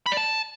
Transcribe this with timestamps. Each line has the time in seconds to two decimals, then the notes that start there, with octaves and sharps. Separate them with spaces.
0.06 B5
0.12 D5
0.17 A5